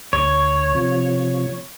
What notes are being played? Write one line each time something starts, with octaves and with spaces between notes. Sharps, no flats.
D2 C#5
C3 F3